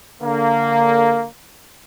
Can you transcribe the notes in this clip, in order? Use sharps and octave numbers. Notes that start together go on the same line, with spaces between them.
D3 A#3